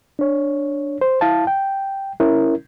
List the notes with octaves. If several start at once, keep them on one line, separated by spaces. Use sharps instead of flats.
D4 C#5
C5
E4 F5 A5
G5
C#4 E4 A#4